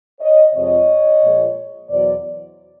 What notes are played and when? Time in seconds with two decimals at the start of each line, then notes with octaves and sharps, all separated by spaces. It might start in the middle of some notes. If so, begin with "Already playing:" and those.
0.20 C#5 D#5
0.53 F2 C3 F3 G#3 C#5 D#5
1.21 A#2 F3 G#3
1.89 E2 B2 F#3 C5 D5